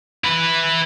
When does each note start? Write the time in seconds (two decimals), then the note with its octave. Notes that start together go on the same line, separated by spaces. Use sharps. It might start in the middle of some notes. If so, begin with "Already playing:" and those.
0.24 E4 B4